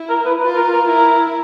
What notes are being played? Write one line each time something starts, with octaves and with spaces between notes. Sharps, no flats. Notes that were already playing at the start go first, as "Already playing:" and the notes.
Already playing: E4
A#4
B4
F4 B4
A#4
A#4
E4 A#4